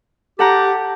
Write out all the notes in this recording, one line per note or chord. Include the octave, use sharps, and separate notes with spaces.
G4 A4 F#5 A#5